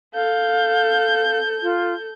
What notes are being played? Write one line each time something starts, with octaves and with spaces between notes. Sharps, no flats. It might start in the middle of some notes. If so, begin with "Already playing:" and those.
A4 F5 G6
F4